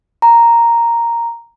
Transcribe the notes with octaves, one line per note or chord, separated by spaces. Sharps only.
A#5